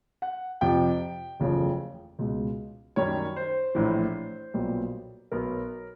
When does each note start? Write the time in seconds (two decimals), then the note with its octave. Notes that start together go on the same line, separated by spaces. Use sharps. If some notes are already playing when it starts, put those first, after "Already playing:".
0.22 F#5
0.61 F2 C3 F3 G5
1.40 F#1 E2 C#3 F3 A3
2.19 C#2 B2 G#3
2.96 F#2 D#3 G3 C#5
3.36 C5
3.75 A#1 A2 E3
4.54 B1 A#2 G3 B3
5.32 B1 B2 F#3 B3 A#4